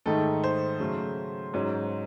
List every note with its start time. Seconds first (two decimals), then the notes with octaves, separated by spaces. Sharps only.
0.06 G#2 D#3 A3 D#4 A4
0.44 C5
0.80 C#3 F#3 A3
1.54 G#2 F#3 C#4